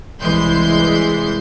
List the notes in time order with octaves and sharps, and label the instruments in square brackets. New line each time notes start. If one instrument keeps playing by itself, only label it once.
[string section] C2 E3 G#3 C6 G6